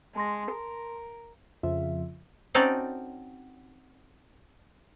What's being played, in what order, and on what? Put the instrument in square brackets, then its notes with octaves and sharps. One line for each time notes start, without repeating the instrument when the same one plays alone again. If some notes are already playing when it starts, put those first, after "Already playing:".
[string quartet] G#3 [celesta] A5 C6 A#6
[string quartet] A#4
[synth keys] F2 C#3 F3 F4 E5
[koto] C4 C#4 D#4 F#4 A4 D5